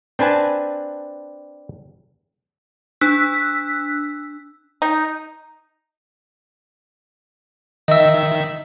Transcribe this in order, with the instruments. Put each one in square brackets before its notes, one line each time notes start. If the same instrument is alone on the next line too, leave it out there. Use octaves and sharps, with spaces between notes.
[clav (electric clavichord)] C4 D4 B4 G#5 A5
[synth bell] D4 E6 F#6 B6
[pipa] D#4
[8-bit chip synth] D#3 E5 [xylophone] D#5 E6